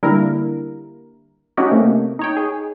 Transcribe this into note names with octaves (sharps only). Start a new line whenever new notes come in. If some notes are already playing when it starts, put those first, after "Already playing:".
D3 G3 A#3 E4 A#4
C#4 D#4 F#4 G4
C3 A3 A#3
D#4 C#5 G5
G#4